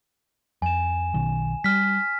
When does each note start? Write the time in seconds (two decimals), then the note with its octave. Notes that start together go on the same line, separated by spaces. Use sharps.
0.62 F2 G#5 E7
1.14 B1 B2 D#3
1.64 G3 F6 B6